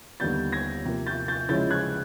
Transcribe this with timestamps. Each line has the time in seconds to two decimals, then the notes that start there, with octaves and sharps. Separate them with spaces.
0.20 D#2 D3 G3 B3 G6 A6
0.52 G#6 A#6
0.85 C3 F3 A#3
1.06 G6 A6
1.28 G6 A6
1.49 C#3 F3 G#3 C#4 E4 G6 A6
1.71 F#6 G#6